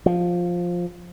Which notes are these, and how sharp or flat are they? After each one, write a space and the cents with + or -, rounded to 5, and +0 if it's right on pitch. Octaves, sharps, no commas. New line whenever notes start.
F3 +10